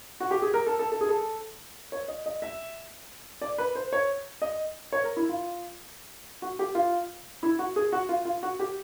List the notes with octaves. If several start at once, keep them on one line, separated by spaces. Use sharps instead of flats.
F#4
G4
G#4
A#4
A4
A4
A4
G#4
A4
C#5
D#5
D#5
E5
D5
B4
C5
C#5
D#5
C#5
A#4
E4
F4
F#4
G4
F4
E4
F#4
G#4
F#4
F4
F4
F#4
G4